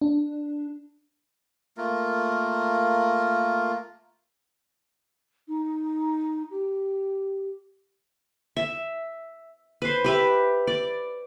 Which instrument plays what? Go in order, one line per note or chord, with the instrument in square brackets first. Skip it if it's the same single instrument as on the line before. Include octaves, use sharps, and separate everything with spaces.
[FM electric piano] D4
[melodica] A3 A#3 F4 A#4
[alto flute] D#4
G4
[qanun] E5
B4 C5
G4 B4 E5
D5